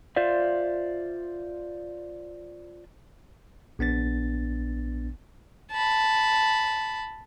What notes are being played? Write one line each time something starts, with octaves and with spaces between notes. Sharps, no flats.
F4 C5 D5 E5 F5
A#1 B3 D4 A6
A5 B5